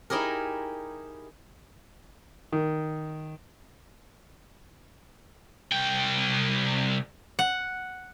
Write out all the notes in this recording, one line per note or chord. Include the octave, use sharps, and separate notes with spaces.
D#4 E4 G4 G#4 A#4
D#3
C2 G5
F#5